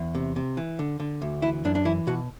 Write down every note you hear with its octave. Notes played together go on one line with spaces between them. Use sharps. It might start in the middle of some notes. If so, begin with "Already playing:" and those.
Already playing: E2
C3
C3
E3
D3
D3
D2
E3 E4
F#2 D4
D4
E3 E4
B2 F#4